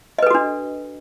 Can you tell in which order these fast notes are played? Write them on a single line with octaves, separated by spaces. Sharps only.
D#5 B4 A4 F#4 D4